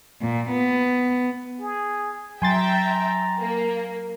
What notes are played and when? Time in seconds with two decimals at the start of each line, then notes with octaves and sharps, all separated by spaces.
0.21 A#2
0.50 B3
1.60 G#4
2.42 F#3 E5 G5 G#5 A#5 C6 A6
3.40 A#3